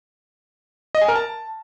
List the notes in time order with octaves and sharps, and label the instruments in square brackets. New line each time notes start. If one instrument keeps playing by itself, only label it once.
[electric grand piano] D#5
G#5
A#4
A5